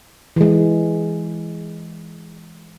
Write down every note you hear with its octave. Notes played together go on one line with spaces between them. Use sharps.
E3 G#3